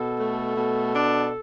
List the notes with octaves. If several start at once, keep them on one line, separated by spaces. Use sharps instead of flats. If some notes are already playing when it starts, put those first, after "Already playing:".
Already playing: B2 A4
A3
B2
D4